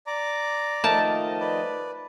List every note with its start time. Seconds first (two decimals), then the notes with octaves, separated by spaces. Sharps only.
0.07 D5 A#5 D6
0.84 D#3 F3 A3 A#4 D#5 A5
1.40 B4 D5